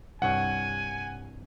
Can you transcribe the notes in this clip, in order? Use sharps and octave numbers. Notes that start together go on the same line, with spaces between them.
C2 G2 C#5 F#5 G#5